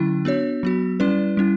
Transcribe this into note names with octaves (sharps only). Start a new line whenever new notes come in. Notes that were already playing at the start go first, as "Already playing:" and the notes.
Already playing: D3 F#3 C#4 E4
B3 D4 F#4 C#5
F#3 B3 F#4
G3 C#4 E4 B4 D5
G3 C#4 E4